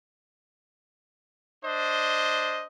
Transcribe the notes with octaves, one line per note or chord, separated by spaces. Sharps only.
D4 C5 D#5